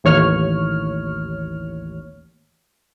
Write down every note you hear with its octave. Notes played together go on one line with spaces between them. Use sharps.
A1 D#2 C#5 F6